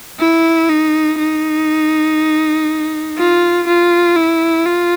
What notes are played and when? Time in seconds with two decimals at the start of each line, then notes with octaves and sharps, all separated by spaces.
0.20 E4
0.70 D#4
1.18 D#4
3.18 F4
3.67 F4
4.16 E4
4.66 F4